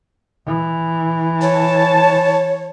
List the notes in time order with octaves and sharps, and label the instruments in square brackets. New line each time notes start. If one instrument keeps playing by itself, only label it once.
[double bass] E3
[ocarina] C#5 [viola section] A5